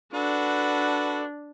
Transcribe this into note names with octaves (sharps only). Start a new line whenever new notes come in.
D4 F#4 A4 B4